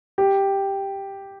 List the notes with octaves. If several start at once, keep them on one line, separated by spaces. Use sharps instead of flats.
G4